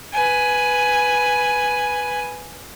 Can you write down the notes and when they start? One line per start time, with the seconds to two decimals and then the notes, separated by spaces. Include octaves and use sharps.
0.13 B4 G#5